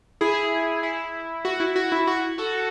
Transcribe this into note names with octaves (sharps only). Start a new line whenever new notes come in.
E4 G#4
E4
F#4
E4
F#4
E4
F#4
F#4 A4